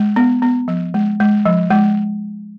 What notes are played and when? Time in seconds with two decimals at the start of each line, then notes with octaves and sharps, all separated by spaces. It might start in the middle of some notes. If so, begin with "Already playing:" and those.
Already playing: G#3
0.16 B3
0.42 B3
0.68 F3
0.94 G#3
1.20 G#3
1.45 F3
1.70 G#3